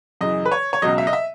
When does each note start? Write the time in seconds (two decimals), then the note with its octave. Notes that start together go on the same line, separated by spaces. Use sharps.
0.21 F#2 C#3 E3 D#5
0.46 B4
0.52 C#5
0.73 C#5
0.82 C#2 B2 F#3 D#5
0.98 E5
1.07 D#5
1.13 E5